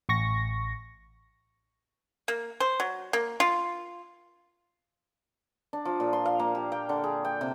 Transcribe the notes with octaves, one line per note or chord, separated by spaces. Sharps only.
A1 C#6 A#6
A#3
C5
F#3
A#3
F4
D4
F3
A#2
C6
F5
A#3
G4
G5
D3
G#4
G5
C3